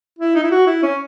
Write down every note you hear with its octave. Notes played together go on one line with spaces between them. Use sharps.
E4
D#4
E4
F#4
E4
C#4